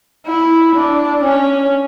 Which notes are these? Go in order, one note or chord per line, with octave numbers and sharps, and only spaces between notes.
E4
D4
C#4